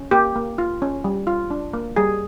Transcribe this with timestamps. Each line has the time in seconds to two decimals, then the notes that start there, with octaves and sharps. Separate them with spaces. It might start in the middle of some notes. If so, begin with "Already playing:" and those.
Already playing: C#4
0.11 A#3 G4
0.36 A#3
0.58 F4
0.82 C#4
1.04 G3
1.27 F4
1.51 D4
1.73 A#3
1.97 G3 G#4